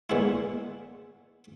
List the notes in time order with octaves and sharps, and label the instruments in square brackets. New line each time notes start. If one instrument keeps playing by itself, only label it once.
[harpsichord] A#2 G#3 B3 E4